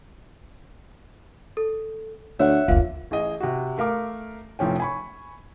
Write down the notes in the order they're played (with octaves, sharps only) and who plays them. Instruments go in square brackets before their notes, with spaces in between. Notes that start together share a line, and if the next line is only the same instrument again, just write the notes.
[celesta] A4
[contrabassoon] D2 [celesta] C#5 [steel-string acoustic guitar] E5 F#5
[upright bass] F#1 D2 [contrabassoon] A#2 [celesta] F5
[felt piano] A1 G#4 D#5
C3 F#4
A3 A#4 F5 D6
F1 A2 F3 C#4 G5
G#5 B5 C#6